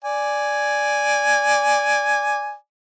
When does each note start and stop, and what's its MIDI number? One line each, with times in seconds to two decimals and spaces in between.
0.04 2.54 74
0.04 2.54 80